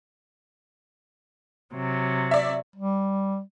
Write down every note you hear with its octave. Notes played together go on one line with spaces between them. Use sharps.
C3 F#3
D5 E5
G3